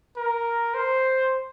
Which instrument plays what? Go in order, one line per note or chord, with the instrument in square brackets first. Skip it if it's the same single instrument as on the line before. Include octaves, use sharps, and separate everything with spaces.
[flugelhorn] A#4
C5